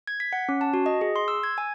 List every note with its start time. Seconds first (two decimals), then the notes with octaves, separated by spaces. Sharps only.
0.07 G#6
0.20 B6
0.33 F#5
0.49 C#4
0.61 A5
0.73 F#4
0.86 D#5
1.01 G#4
1.16 C6
1.28 E6
1.43 G#6
1.58 G#5